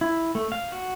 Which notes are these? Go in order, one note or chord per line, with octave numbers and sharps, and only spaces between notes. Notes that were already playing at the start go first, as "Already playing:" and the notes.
E4
A3
F5
F#4